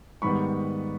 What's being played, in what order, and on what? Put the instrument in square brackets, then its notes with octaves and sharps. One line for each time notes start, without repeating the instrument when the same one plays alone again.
[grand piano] G#2 D#3 G3 B3 B5 C#6